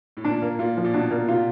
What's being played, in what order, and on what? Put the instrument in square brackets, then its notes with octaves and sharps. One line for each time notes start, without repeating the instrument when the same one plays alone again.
[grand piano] A2
[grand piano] A#2 [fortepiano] D4
[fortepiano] A#3
[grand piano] A#2 [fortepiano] F4
[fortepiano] F3
[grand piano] A#2
[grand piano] B2 [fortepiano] D4
[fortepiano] A#3
[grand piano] C3 [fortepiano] F4